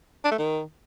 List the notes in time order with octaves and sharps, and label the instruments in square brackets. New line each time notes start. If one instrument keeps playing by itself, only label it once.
[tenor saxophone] D4
A3
D#3